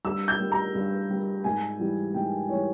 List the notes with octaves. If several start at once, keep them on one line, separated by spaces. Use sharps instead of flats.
G2 E6
G6
G3
A#5
G2
G3
G#2 G#5
E3 G3
G#2 G5
E3 G3 C#5